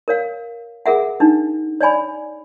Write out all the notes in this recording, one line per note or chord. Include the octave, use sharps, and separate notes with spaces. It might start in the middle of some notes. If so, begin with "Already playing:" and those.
A#4 C#5 F5
G#4 A#4 E5 F#5
D4 D#4
C#5 D5 G#5 B5